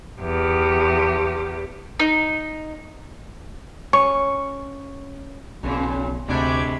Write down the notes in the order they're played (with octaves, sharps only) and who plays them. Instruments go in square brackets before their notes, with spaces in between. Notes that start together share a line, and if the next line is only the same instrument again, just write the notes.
[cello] E2 G4
[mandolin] D#4
[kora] C#4 [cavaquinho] C#6
[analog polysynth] B1 [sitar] F2 A#2 C#3
[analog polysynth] D2 D6 G#6 [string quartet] C3 G#3 B5 [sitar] A3 D4